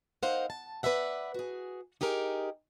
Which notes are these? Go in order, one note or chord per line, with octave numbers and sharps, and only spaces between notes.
D#4 A#4 C5 F5 F#5
A5
B4 C5 D5 E5 F#5
F#4 G#4
D#4 G4 G#4 A#4